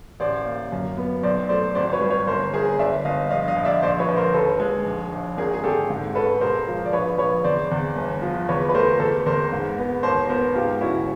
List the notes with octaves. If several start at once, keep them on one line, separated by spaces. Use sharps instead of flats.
A1 C5 D5
A#3
F#2
B3
B1 C5 D5
A3 C5 D5
G#1 C5 D5
B4 C#5
G3
B4 C#5
G1 A#4 C5
G1 G#4 A#4
G1 D5 E5
G1 D#5 F5
A#1 D#5 F5
D#5 F5
A#1
D5 E5
A#1 C5 D5
B4 C#5
A#1
A#4 C5
D#2 A4 B4
G#3
A#1
A#1
G#1 G#4 A#4
G#4
G#1 G4 A4
G#2
C#4 A4 B4
E1 A#4 C5
F3
D5
A#1 B4 C#5
A#1 B4 C#5
E2 C5 D5
E2
G1
F3
E2 B4 C#5
B4
A3 A#4 C5
E2 A4 B4
E2 A#4 C5
G#2
B3
D#2 A#4 C5
B3 A#4 C5
G#2 F4 G4
C#4 E4 F#4